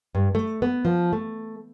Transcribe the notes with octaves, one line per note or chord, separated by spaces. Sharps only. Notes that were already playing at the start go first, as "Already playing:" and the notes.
G2
A3
B3
F3
A3